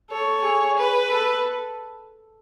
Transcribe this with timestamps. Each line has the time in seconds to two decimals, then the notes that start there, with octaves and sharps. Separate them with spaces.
0.10 A4 C#5
0.43 G#4
0.77 B4
1.10 A4